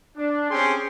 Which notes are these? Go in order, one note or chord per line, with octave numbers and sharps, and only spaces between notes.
D4
C4 C#4 G4 G#4 G5 C6